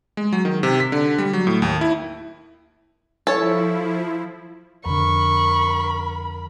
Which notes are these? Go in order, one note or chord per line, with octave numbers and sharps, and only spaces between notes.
G#3
F#3
D#3
C3
B6
D3
G3
F#3
A2
D#2
E4
F3 E4 A4 C#5
F2 D3 A#4 B5 C#6